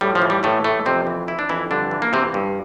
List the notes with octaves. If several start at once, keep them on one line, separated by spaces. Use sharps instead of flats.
A2 G3
F3
E3
G3
A2 E3 A3
A2 A3
F2 C3 C4
E3
E3 E4
D4
F2 E3 E4
G2 D3 D4
E3
A#3
C3 E3 C4
G2